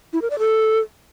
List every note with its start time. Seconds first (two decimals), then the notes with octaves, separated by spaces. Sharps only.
0.13 E4
0.22 A#4
0.30 D5
0.39 A4